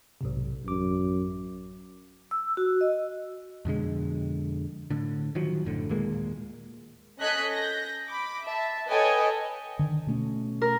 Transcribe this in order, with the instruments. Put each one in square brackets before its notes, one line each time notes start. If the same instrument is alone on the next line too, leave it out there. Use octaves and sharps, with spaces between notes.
[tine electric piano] B1 G#2 C3
[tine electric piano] A1 D6 [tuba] F#2
[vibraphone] E6
F#4
D#5
[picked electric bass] F2 B2 D3 G#3
A2 D3
D#3 F3 F#3
F#1 A2 D3
D#2 A#2 G#3 A#3
[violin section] C#4 A4 D#5 F#6 G#6 B6
G6 A#6
B5 D6
E5 A5
A4 B4 C#5 D#5 G5 G#5
[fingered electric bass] D3 D#3
B2 A3 C#4
[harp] A#4